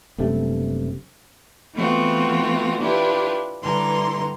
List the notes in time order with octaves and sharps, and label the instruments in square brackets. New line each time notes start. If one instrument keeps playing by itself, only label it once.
[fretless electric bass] F#1 G2 C3 A3
[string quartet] E3 A3 B3 C4 F4 F#4
D4 E4 F4 G4 B4
G2 D3 E3 A#5 C6